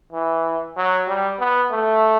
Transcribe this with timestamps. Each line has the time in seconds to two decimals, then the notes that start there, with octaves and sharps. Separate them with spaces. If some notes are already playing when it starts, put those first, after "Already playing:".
0.12 E3
0.77 F#3
1.08 G3
1.40 B3
1.71 A3